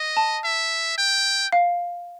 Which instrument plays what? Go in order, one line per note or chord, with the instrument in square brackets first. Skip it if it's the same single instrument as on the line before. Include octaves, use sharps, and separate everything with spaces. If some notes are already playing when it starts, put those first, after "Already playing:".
Already playing: [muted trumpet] D#5
[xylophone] A5
[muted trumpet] E5
G5
[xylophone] F5